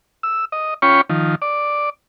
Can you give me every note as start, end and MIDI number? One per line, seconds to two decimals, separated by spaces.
0.23 0.45 88
0.52 0.74 75
0.82 1.01 61
0.82 1.01 65
0.82 1.01 73
0.82 1.01 79
0.82 1.01 83
0.82 1.01 85
1.10 1.35 51
1.10 1.35 53
1.42 1.90 74